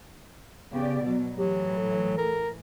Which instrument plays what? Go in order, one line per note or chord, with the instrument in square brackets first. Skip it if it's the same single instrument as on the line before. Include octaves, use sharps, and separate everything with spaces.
[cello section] C#3 G4 D5 [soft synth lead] B3
[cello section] B2 F#3
[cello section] A2 E3 [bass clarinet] F#3 [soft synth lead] G4
[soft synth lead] A4
[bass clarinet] A#4